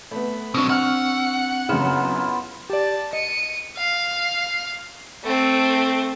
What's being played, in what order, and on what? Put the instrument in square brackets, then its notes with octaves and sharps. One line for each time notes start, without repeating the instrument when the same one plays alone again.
[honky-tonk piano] A3 B3 [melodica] B5
[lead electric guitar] B2 F#3 [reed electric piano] C4 D4 [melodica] E6
[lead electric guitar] F#5 [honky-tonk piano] C#6 F6
[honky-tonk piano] F#2 C#3 [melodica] B3 E4 F4
[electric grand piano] G4 D5 [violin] A5
[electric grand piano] D#5 [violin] C#7 D#7
[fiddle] F5
A3 C4